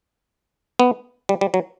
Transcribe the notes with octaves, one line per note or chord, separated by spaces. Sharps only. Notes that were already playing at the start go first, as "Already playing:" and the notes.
B3
G3
G3
F#3